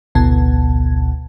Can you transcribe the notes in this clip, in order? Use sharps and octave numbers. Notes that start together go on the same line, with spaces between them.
A1 D2 B2 B3 A5 G#6